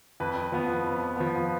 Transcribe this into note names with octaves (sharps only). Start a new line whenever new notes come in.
F2 B4
F3 B3
F2
F3 B3